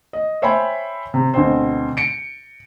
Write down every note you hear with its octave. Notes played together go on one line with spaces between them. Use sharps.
D#5
C5 C#5 E5 G5 G#5 B5
C3
D2 B2 C4 C5
C#7 D7